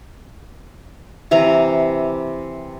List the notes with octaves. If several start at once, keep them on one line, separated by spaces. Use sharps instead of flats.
C3 E3 A#5